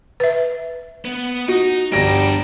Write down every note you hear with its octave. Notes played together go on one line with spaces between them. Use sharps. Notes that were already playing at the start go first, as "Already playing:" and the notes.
B4 E5
B3
D#4 F#4
G1 G3 D4 A#4 A#6 D7